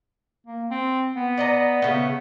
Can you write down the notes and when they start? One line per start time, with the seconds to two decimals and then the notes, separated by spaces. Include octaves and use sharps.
0.46 A#3
0.70 C4
1.16 B3
1.37 D5 D#5 A#5
1.82 C#3 A3 B3